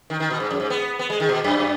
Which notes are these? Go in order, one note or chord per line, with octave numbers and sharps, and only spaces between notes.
D#3
D#3
B2
G#2
F#2
G#2
B3
B3
G#3
D#3
B2
F#2